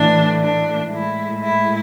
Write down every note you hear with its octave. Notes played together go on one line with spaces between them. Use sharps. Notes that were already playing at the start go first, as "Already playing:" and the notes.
Already playing: A2 E3 A3 D4
D4
A2 G#3 E4
E4